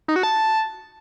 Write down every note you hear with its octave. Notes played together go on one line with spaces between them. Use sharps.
D#4
F#4
A5